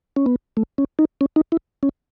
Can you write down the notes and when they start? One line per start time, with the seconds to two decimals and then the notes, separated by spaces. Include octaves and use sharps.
0.16 C#4
0.26 B3
0.57 A3
0.78 C#4
0.99 D#4
1.21 C#4
1.36 D#4
1.52 E4
1.83 C#4